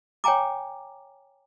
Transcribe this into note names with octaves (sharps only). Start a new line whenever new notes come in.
C#5 G5 G#5 A#5 D6